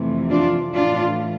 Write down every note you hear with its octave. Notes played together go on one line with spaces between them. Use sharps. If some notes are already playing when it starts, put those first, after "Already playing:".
Already playing: F2 C3 E3 A3
D4 F4
A2 E3 A3 D4 F4